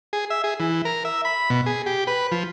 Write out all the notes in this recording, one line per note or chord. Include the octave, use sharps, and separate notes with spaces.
G#4
E5
G#4
E3
A#4
E5
B5
B2
G#4
G4
B4
F3